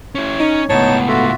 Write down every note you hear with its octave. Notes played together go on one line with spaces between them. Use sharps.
C#4 E4 C#5
C#4 D#4
C#2 A2 B3 D#4 C#5 A5
F4 F#4 A4 E5